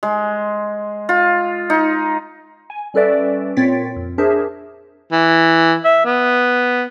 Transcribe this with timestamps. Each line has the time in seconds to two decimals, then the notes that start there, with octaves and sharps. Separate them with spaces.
0.03 G#3
1.09 F4
1.70 D#4
2.70 G#5
2.94 G3 C#4 A4 B4 D5 E5
3.56 A#2 C4 C#5 A6 B6 D7
3.96 F2
4.18 D4 G#4 A#4 C5 E5
5.12 E3
5.84 E5
6.05 B3